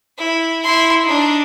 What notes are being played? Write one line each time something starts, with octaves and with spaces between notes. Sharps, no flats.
E4
E4 C6
D4 D#4